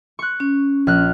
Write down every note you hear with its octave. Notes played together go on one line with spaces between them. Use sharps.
C#6 F#6
C#4
A#1 F6 F#6